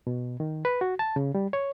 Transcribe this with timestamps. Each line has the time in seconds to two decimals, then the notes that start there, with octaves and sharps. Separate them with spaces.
0.07 B2
0.40 D#3
0.65 B4
0.81 F#4
0.99 A5
1.16 C#3
1.35 G3
1.53 C#5